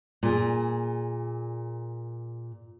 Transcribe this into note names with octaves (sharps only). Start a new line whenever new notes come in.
A#2 G#4